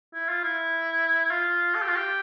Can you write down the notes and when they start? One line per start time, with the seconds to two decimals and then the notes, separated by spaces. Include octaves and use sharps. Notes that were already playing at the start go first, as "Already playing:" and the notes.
0.14 E4
0.29 F4
0.43 E4
1.30 F4
1.75 A4
1.82 G4
1.89 F4
1.96 G4